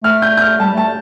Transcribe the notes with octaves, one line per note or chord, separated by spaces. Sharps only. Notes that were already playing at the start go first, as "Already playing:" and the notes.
A3 F6
G6
G6
F6
G3 A5
A3 A5